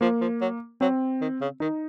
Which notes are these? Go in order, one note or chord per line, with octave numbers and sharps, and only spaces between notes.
F3 A#3
F3
F#3
F#3 C4
D#3
C#3
D#3 D#4